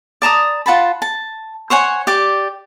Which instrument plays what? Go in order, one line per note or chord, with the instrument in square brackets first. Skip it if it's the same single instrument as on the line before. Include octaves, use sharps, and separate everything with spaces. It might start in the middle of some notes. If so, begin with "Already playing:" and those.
[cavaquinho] D5 A5 A#5 D#6
F4 F#5 A5 B5
A5
C5 C#5 F#5 G#5
G4 D5 D6